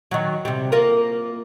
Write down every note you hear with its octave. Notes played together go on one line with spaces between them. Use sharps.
D#3 F#3
C3 G3
A#3 F4 A#4